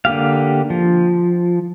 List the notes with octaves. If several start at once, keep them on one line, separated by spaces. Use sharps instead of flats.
D3 A#3 G4 F5
F3